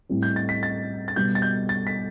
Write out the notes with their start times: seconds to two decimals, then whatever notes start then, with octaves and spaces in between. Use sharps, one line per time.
0.09 A2 G3 C4
0.23 G6
0.36 A6
0.49 B6
0.63 A6
1.08 A6
1.16 B2 G3 B3 G6
1.35 A6
1.42 G6
1.69 A6
1.87 B6